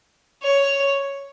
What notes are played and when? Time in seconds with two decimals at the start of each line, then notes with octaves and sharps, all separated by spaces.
0.42 C#5